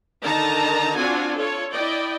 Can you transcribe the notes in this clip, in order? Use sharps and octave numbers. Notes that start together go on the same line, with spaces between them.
D3 D#3 D#4 A5 A#5
C4 D4 F4 F#4 G#5
F4 A4 C#5
E4 D5 D#5 G5